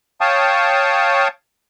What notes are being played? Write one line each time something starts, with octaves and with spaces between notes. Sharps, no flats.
C#5 F5 G5 A5 C#6 D#6